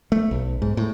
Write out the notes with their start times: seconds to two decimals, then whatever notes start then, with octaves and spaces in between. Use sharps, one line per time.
0.12 A3
0.31 B1
0.62 G#2
0.77 A2